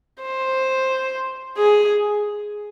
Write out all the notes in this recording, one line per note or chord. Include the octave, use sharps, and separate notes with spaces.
C5
G#4